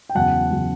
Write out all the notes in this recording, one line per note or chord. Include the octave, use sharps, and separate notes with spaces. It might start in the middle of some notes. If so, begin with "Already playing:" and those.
G5
E2 C#3 F#3 F#5 A5
C#3 F#3